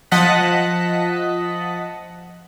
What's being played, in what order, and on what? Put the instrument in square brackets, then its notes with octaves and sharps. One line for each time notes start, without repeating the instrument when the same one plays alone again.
[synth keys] F3 D#5 F#5 A5 F#6 B6